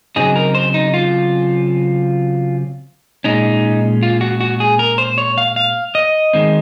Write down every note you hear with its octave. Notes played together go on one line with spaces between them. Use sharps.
C#3 F#3 C4 D#4 G#4
A#4
C5
D#4
F4
A#2 G#3 C#4 D#4
F4
F#4
F#4
G#4
A#4
C5
C#5
F5
F5
D#5
D#3 G#3 C4